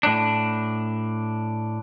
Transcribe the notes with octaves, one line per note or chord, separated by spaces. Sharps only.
A2 D4